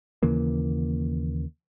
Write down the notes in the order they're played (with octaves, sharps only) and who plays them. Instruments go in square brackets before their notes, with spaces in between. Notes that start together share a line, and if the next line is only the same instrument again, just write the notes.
[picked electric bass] D#2 C#3 E3 A#3